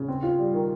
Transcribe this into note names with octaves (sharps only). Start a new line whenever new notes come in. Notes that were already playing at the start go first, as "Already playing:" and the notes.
Already playing: C#3
C4
F4
G3
D#3